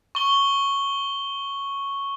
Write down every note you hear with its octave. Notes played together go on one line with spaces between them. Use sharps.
C#6 G7